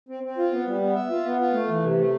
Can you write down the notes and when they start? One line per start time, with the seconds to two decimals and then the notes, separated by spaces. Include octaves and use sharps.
0.09 C4
0.23 C4
0.38 F4
0.52 B3
0.66 G3
0.82 B3
0.95 E5
1.10 F4
1.25 B3
1.39 F4
1.53 A3
1.69 E3
1.83 C3
1.98 A3